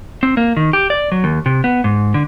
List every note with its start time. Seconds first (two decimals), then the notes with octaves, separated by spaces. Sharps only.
0.23 C4
0.37 A#3
0.57 D#3
0.73 G4
0.90 D5
1.12 F#3
1.24 D#2
1.46 C3
1.64 B3
1.84 G#2
2.14 D3